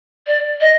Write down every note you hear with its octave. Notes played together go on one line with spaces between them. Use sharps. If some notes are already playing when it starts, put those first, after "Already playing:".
D5
D#5